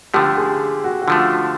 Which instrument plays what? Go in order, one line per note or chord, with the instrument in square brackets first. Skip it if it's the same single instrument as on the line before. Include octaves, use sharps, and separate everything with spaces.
[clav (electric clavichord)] D3 F3 A3 [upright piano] G4
[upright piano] G#4
F#4
F#4
[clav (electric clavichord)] D3 F3 A3 [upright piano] F4